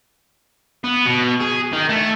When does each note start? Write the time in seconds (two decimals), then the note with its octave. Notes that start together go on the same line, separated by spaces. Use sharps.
0.84 B3
1.06 B2
1.41 G#4
1.73 D#3
1.89 A3